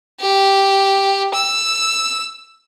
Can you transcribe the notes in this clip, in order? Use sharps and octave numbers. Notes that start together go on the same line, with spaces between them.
G4
E6